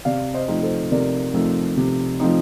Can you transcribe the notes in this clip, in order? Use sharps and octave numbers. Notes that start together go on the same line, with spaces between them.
C3 D5 F5
C5 D#5
F3 A3 C4 D#4
A4 C5
C3 A#4 D5
F3 A3 C4 D#4
C3
F3 A3 C4 D#4